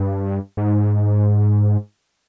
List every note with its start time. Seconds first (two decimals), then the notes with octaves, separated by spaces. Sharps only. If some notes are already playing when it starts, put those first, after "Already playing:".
Already playing: G2
0.57 G#2